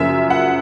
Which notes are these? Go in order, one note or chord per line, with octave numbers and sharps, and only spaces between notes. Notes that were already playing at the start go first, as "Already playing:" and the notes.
Already playing: F#2 C#3 F3 A#3 E5
F#5